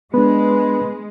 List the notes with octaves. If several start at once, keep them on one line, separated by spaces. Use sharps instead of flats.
G#3 B3 D4 B4